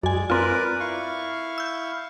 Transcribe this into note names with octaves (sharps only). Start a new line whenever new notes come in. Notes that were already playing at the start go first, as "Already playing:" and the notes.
F#2 G#3 D5 G#5
C4 F4 A#4 B4 D5
E4 F5 C#6
E6 G6